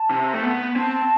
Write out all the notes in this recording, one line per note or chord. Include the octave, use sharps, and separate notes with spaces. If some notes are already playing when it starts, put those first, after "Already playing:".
Already playing: A5
C3
A3
B3
C4 A5